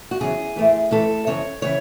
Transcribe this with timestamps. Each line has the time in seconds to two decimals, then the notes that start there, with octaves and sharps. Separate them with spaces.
0.11 F#4
0.21 E2 C#3 F#3 G#4
0.56 A2 E3 A3 C4
0.91 A2 E3 A3 C4 A4
1.27 F#2 C#3 E3 C4 C#5
1.62 C#3 E3 C4 C#5